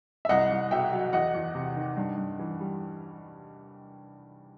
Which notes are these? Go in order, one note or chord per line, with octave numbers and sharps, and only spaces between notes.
E5
C2 D#5 F#5
C2
B2 E5 G5
F#3
E2 D#5 F#5
E2
C3
D#3
G2
G2
E3
G3